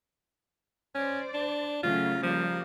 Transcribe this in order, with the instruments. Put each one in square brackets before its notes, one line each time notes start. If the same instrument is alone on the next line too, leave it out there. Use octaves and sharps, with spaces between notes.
[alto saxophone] C#4 [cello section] C5 D5
[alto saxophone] D4
[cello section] C#3 F#3 A3 [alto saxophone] F4
[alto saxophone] F3 [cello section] G3 A#3